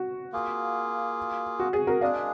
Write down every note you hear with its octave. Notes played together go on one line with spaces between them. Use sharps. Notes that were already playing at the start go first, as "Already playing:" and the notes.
Already playing: F#4
A#3 F4 G#4
F#4
G#4
F#4 A#4
G#3 D4 G#4 D5 F5